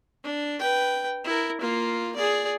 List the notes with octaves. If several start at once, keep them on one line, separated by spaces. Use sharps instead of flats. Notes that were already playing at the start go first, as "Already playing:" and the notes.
D4
B4 G5
E4 A#4
A#3 F4
G#4 D5